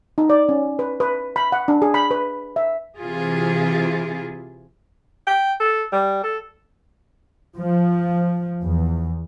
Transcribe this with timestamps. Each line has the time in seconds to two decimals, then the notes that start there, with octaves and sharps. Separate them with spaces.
0.18 D#4
0.30 D5
0.49 C#4
0.79 B4
1.00 B4
1.36 B5
1.52 F#5
1.68 D4
1.82 G#4
1.94 B5
2.11 B4
2.56 E5
2.97 C3 E3 E4 F4 G#4
5.27 G5
5.60 A4
5.93 G3
6.24 A4
7.56 F3
8.61 E2